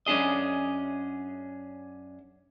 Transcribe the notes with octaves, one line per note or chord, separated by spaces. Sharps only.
F#2 C#4 D4 G#4 D#5